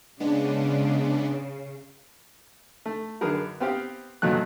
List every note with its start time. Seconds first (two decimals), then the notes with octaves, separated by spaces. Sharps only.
0.20 C#3 G#3 B3 D4
2.86 A3
3.21 F#2 D3 G#4 A#4 B4
3.60 B3 C4 G4 F5
4.22 A#1 G2 B2 F#3 A3 F#6